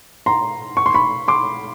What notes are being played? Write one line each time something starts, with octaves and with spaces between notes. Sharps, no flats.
A#5 C6
C#6
C6
B5 C#6
C6 D6